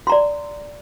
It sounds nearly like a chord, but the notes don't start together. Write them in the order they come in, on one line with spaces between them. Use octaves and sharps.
C6 A#5 D5